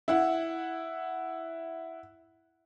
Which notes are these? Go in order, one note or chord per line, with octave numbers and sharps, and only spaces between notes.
E4 F#5